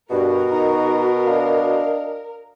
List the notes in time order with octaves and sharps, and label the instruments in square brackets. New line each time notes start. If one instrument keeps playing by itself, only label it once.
[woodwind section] G2 [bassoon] B2 [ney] F#4 [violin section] A#4
[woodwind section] D#4 A#5
D4 D#5 F5